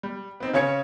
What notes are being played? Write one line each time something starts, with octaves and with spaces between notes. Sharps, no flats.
G3
B3 C4 D#4
C#3 C#4 C#5 G#6 C#7